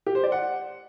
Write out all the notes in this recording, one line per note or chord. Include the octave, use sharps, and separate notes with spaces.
G4
C5
D5
F#5